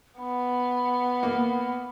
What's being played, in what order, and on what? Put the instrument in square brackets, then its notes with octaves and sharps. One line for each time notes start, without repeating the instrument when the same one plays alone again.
[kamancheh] B3 [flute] B5
[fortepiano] A#3